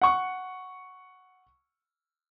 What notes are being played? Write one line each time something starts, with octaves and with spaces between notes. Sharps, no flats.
F#5 C#6